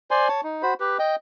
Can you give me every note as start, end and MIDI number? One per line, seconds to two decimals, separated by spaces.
0.11 0.28 72
0.11 0.28 74
0.11 0.28 80
0.11 0.28 84
0.28 0.41 73
0.28 0.41 81
0.44 0.62 63
0.62 0.74 66
0.62 0.74 72
0.62 0.74 83
0.80 0.98 67
0.80 0.98 71
0.99 1.16 75
0.99 1.16 79